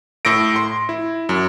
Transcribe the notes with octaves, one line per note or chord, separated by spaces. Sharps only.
A2 E6 A#6 D7
C6
E4
F#2